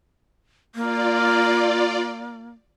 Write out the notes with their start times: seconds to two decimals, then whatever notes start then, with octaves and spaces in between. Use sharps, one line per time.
0.75 A#3 F4 D5